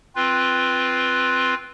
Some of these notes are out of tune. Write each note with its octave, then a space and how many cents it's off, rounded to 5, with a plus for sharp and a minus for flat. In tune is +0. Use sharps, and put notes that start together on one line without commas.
C4 +0 F4 +0 B4 +0